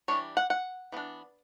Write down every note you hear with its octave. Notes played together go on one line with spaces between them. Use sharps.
E3 G3 D4 C#5
F#5
F#5
E3 B3 D4